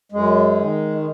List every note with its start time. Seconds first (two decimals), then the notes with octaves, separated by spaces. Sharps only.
0.12 F#2 G#3
0.59 D#3
0.98 G#3